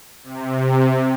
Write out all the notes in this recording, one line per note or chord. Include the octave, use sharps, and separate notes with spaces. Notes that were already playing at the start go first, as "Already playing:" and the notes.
C3